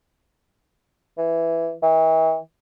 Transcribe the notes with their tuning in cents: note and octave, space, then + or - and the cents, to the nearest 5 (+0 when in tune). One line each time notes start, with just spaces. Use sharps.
E3 +5
E3 -40